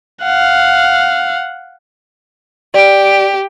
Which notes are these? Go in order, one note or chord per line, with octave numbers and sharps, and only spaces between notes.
F5 F#5
G4 D5 D7